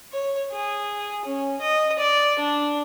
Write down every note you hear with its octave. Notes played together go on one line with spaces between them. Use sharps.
C#5
G#4
C#4
D#5
D5
D4